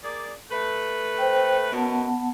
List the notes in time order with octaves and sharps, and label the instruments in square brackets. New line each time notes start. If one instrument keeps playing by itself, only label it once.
[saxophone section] A#3 G#4 D5
A3 B4
[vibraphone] C5 G5
[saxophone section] F#2 B2 [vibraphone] B3 F#5 A5